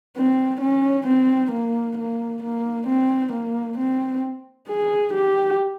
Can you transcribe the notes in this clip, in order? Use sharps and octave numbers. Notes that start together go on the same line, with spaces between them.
C4
C#4
C4
A#3
A#3
A#3
C4
A#3
C4
G#4
G4